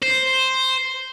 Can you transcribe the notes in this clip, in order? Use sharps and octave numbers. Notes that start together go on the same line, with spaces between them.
C5